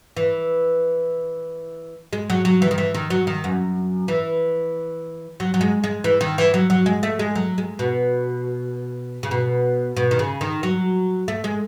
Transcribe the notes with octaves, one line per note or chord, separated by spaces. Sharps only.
E3
G#3
F#3
F#3
E3
D#3
E3
D#3
F#3
D#3
F#2
E3
F#3
F#3
G#3
G#3
E3
D#3
E3
F#3
F#3
G#3
A3
G#3
F#3
G#3
B2
C#3
B2
B2
D#3
C#3
D#3
F#3
A3
G#3